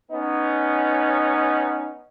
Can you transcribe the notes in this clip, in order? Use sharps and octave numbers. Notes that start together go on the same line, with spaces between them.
B3 C#4 D#4